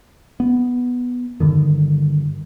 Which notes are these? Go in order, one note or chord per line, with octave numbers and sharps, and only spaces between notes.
B3
G2 D3 D#3